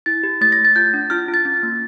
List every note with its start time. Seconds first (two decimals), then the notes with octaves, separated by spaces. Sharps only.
0.06 E4 A6
0.23 G4
0.41 A3 A6
0.52 A#6
0.58 A3
0.65 A6
0.76 F4 G6
0.94 D4
1.10 F4 F6
1.28 F4
1.34 A6
1.45 C#4 A6
1.63 A#3